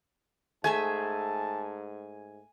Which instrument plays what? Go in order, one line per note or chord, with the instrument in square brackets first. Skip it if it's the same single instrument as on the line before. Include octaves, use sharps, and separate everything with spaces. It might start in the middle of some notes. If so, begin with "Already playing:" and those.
[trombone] G#2 [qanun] A3 G#4 E5 [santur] G#5 [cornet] A5